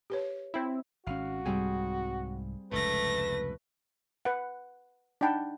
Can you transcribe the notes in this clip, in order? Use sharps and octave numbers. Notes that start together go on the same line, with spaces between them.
G4 B4 C#5
C4 E4
G#1 C#4 F#4 F5
C2 G#2 G3 C4 G#4
F1 C#2 G#2 A3 B4 A#6
B4 F#5
D4 D#4 F#5 G5 A5 B5